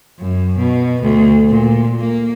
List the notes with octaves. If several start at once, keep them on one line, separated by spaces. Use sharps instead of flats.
F#2
B2
D2
A#2
A#3